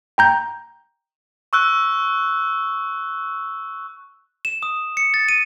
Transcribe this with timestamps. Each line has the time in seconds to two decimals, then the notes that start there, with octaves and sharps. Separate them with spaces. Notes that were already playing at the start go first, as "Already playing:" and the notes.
0.18 G5 A#5 G6
1.53 C#6 E6 F#6
4.45 E7
4.63 D#6
4.97 C#7
5.14 A6
5.29 D#7